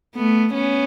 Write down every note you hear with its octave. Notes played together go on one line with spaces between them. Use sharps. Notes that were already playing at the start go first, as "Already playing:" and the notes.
A3 B3
B3 C#4